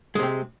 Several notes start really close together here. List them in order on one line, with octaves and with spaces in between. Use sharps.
G#3 C3 C4